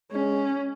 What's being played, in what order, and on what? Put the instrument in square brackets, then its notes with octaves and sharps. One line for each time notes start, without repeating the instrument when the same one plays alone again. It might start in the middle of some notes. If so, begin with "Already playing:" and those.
[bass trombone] G#3 [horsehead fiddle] C#4